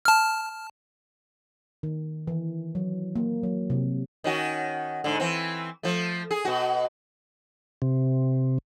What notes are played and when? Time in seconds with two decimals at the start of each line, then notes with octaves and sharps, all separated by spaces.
0.05 A5 F6
1.83 D#3
2.27 E3
2.75 F#3
3.16 A#3
3.43 F#3
3.70 C3
4.24 D#3 C#4 F#4
5.04 G#2 D3
5.20 E3 C4
5.83 F3 A3
6.31 G#4
6.45 B2 F#4
7.82 C3